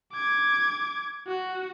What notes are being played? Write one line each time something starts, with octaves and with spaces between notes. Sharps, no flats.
D6 G#6
F#4